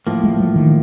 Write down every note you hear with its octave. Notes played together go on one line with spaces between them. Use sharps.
A2 F3 A#3
G#3
F#3
D#3